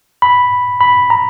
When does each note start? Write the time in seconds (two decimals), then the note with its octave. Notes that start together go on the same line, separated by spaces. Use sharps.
0.22 B5
0.81 B5
1.10 A#5